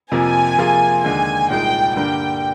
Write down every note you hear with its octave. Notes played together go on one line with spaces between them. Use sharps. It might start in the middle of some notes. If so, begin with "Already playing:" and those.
F2 C3 F3 A#3 G#5
C3 F3 A#3 F4 G#4
D#2 D3 G#3 G#5
C2 A#2 G#3 D#4 G#4 G5
G2 D3 G3 A#3 D4 G5